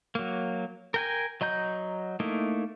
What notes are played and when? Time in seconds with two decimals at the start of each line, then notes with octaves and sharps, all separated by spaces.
0.15 F#3 A#3
0.94 A#4 G5 G#5
1.41 F#3 D#5 A#5 G6
2.20 A3 A#3 D#4 E4